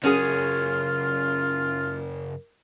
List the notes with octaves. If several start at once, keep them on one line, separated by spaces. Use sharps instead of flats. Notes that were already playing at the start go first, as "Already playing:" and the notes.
F#2 C#3 C#4 F4 F#4 G#4 A#4